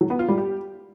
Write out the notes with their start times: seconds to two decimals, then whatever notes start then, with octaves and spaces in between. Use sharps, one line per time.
0.01 F#3
0.10 B3
0.19 F4
0.28 G3
0.38 G4